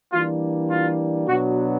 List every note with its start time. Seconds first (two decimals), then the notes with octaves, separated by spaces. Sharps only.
0.12 E3 G3 A#3 D4 F4
0.70 F4
1.27 B2 F#3 B3 D4 F#4